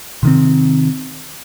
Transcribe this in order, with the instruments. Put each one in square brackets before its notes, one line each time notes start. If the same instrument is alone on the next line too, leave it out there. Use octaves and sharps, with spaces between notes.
[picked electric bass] C3 D#3 C4